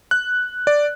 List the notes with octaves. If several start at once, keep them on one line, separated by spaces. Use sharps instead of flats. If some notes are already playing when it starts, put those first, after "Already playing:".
F#6
D5